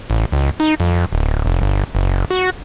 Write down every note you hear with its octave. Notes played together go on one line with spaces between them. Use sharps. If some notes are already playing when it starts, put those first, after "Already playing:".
A1
C#2
D#4
F2
D1
F1
G1
F#1
F#4